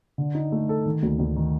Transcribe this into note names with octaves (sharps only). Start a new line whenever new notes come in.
D3
D#4
A3
A4
D#3
D2
D2
D#3